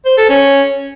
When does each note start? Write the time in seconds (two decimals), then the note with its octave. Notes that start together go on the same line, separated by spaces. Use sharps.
0.06 C5
0.18 A4
0.29 C#4